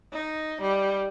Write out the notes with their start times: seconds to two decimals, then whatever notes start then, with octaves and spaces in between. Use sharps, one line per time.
0.13 D#4
0.61 G3